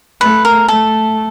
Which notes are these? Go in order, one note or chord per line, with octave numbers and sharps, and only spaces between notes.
A3 B4
A#4
A3 A4